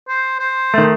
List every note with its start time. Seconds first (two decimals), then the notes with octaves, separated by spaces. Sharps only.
0.08 C5
0.39 C5
0.74 D#3 A3